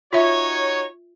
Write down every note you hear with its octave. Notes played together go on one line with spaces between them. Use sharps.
D#4 F4 F#4 C#5 E5